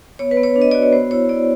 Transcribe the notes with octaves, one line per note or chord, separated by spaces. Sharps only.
B3 C#5
B4
B3
C#5
D4
D#5
F#4 D5
C#5
B3 C5
E4 C#5
E4 D5